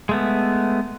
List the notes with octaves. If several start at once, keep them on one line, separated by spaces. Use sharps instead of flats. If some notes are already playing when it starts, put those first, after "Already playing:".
G#3 A3 B3